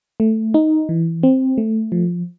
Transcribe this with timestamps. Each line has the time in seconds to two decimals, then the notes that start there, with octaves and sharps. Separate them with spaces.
0.20 A3
0.54 D#4
0.89 E3
1.23 C4
1.58 A3
1.92 F3